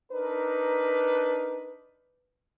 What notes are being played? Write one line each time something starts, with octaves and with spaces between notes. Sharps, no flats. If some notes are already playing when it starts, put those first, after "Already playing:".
D4 D#4 A#4 B4